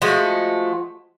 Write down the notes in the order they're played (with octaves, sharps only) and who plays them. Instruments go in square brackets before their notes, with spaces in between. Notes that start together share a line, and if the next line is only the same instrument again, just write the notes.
[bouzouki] F3 G#3 A3 F#4